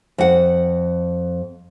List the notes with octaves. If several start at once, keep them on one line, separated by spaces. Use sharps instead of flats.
F2 F#5